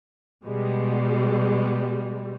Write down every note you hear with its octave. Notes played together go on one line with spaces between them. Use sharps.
B2 G3 G#3